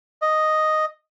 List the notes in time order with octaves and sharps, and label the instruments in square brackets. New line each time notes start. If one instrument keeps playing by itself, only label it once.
[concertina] D#5